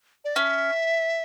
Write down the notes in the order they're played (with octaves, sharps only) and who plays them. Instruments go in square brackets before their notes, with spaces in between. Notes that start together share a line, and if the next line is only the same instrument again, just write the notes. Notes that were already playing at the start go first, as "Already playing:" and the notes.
[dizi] D5
[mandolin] C#4 [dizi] E5